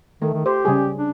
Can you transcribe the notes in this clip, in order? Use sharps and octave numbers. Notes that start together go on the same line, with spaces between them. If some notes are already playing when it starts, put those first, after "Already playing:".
D#3 A3
D#3
G4 C5
C#3 G3 G#4
D4